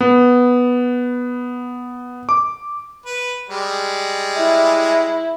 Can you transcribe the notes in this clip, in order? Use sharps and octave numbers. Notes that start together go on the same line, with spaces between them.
B3
D6
B4
G3 G#3
E4